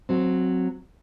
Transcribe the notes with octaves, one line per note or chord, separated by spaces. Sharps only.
F#3 C4